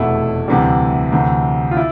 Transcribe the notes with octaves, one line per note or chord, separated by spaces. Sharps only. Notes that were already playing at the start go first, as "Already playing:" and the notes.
Already playing: F1 E2 B2 A3 E4
D2 C3 E3 G3
D2 C3 E3
F4
E4